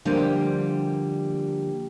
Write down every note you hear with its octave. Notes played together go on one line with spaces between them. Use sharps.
D3 F3 G3 A#3 G4